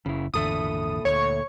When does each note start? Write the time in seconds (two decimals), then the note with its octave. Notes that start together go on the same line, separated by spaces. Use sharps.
0.06 F#1 C#3 E4
0.34 G#1 E2 A#2 D3 A4 E5 D#6
1.05 D2 C#5 C#6